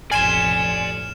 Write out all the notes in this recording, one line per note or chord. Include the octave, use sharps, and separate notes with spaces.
A1 F2 D5 G#5 C6 F6 C7 E7